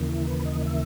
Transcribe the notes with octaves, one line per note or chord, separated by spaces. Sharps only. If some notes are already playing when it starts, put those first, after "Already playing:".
Already playing: D#2 C#3 E3 A#3
E4
B4
D#5
E5